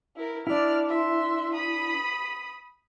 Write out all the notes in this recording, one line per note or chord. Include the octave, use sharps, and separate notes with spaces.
E4 A#4
D4 E4 D5 F6
E5 C6
B5 D#6